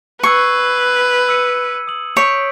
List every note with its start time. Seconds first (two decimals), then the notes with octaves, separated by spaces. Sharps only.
0.23 B4 C#6 E6 G#6 C7
1.29 E6 C#7 D#7
1.87 D#6 F#7
2.17 C#5 G6 B6 D7